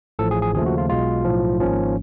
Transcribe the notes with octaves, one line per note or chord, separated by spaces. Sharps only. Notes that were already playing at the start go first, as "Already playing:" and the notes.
A1 A2 F3 A4
G#4
G#4
D#2 C#3 F3 A3 G#4
F#4
F4
B1 B2 G#3 F4
B1 A2 F3
G#1 G#2 F3 A#3 C#4